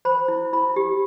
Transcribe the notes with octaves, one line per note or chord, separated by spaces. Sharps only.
C5 B5
E4
E4 B5
G4